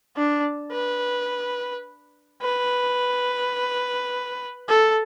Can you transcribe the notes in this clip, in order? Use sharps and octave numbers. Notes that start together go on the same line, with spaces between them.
D4
B4
B4
A4